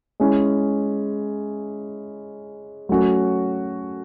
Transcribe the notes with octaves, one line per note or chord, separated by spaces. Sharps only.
G#3 C#4 E4
F#3 A3 C#4 F#4